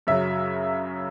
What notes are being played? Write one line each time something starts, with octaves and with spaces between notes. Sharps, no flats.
F#2 C#3 F#3 E5